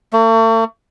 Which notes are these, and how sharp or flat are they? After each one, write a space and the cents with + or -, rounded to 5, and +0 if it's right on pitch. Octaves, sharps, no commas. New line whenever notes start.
A3 +45